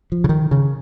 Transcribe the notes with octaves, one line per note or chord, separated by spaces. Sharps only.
F3
C#3
D#3
C#3